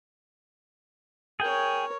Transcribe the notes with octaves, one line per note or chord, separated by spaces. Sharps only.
G#4 A#4 C#5 G5